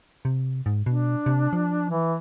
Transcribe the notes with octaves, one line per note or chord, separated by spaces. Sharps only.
C3
G#2
B2 D4
C3
F3
E3